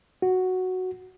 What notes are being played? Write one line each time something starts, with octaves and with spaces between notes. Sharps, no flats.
F#4